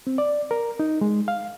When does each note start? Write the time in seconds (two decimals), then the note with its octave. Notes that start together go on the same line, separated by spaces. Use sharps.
0.07 C4
0.18 D5
0.51 A#4
0.80 D#4
1.01 G#3
1.28 F5